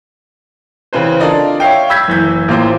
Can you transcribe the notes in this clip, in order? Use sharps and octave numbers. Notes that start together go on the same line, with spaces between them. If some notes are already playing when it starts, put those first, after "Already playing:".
C#3 E3 C4 B4 C5
D4 F4 A4 A#4 D5 D#5
C#5 E5 F5 G5
B5 E6 G6 G#6 B6
F#1 E3 G6
A1 A#3 F4 C5 D6